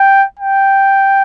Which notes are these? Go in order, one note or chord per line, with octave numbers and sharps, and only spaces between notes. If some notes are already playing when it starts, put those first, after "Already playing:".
Already playing: G5
G5